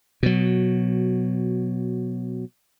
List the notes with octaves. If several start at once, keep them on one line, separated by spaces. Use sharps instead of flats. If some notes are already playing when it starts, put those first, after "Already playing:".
B2 F#3